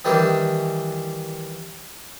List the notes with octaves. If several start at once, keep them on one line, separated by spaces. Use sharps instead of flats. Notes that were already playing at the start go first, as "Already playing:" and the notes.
D#3 E3 G3 D4